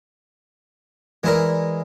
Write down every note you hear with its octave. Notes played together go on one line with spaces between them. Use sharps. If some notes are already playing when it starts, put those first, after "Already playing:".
E3 G#3 E4 A#4 D5